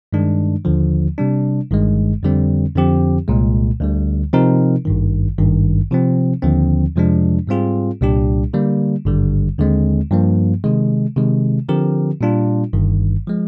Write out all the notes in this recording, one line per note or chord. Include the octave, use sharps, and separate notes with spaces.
G2 D#3 G#3 D4
D#2 D3 F3
C3 G3 D4
G1 G2 D#3 G#3
F2 D3 G3 C4
F2 D3 F3 C4 G4
C2 A#2 G#3
D2 D3 G3
C3 F3 C4 D#4 A#4
G#1 G2 D#3
G#1 G2 D#3
C3 F3 C4
D#2 D3 F3 C4
F2 C3 F3 G#3 D4
G#2 G3 C4 F4 G#4
C2 A#2 G3 D4 G4
D3 G3 A#3
G#1 G2 D3 G3
D#2 D3 G#3 C4
G2 F3 A#3
C3 D#3 G#3
C3 D#3 G#3
D3 F3 C4 G4 A#4
A#2 G3 D4 F4
G1 G2 D#3
F3 G#3